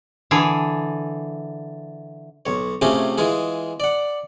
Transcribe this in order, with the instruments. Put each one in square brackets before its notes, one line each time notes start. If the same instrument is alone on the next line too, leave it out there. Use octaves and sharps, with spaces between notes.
[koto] D3 E3 G#4
[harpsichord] B1 C#5
C3 A3 C#4 F4 G4 G#4
E3 G#3 F4 G#4
D5 F#5